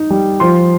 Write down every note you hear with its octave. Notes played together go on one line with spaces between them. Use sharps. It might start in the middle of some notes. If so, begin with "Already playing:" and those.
Already playing: D#4
G3
F3 C6